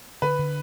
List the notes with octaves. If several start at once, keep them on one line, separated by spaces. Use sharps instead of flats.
D3 B4
D3